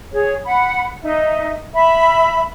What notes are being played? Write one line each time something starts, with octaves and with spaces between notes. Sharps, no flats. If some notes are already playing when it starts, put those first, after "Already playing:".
G#4 C#5
F#5 B5
D#4 E5
E5 B5